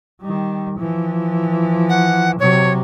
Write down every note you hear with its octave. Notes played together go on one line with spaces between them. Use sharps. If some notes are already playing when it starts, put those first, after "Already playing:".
D#3 G3
E3 F3
F#5
C3 F#3 C#5